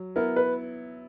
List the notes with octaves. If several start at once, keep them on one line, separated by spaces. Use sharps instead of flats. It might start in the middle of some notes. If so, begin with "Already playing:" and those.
Already playing: F#3
B3 E4 A#4
B4